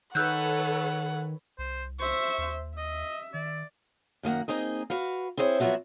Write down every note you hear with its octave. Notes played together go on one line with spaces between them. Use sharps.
D#3 A4 B4 C#5 F#5 E6 F#6 G6
C2 C5
C5 E5 C#6
D#2
D#5 E5
D#3 D5
F#2 D#3 A#3 F#5
A#3 C4 D#4 G#4 D#5
F#4 B4 F5
C4 E4 G#4 C5 C#5
F3 F#3 B3 F4 F#4 E5